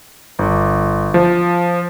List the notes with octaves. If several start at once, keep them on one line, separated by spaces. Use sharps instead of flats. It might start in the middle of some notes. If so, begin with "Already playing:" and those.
G1
F3